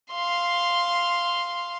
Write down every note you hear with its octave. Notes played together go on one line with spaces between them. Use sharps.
F5 C6